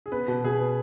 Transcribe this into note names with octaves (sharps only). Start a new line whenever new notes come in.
G#4
B3 B4
B2
B2 G#4
B3